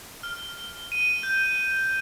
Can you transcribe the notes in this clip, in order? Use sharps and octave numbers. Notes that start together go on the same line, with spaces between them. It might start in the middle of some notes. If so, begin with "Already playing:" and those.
F6
D#7
G6